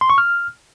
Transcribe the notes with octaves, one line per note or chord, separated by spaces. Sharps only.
C6
C#6
F6